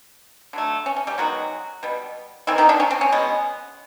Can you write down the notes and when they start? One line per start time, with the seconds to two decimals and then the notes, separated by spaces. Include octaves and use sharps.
0.53 D3 F#3 A3
0.86 C#4
0.96 C#4
1.07 G3 G4
1.18 D#3 F#3 G#3 B3 F#4
1.83 B2 G3 B3
2.47 D#3 E3 G3 C4 E4
2.58 D#3 D#4
2.69 D3 D4
2.80 C#4
2.91 C4
3.01 C#4
3.12 B2 G#3 B3